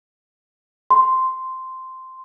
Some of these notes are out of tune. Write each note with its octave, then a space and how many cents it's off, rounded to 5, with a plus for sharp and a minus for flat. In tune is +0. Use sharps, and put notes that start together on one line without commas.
C6 -5